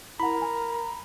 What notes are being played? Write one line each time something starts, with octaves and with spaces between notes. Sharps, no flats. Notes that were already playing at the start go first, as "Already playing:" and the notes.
E4 A#4 F#5 A#5 B5
G#5